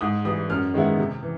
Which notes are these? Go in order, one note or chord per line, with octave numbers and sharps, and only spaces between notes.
G#2 D#6
E3 G3 D#6
F#2 F6
D#3 G#3 B3 E4
C3
E3